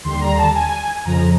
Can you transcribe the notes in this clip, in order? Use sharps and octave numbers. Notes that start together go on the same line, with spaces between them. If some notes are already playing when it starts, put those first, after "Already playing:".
D#2 D3 G3 C6
A#5
A5
G#5
F2 C#3 F3 A#5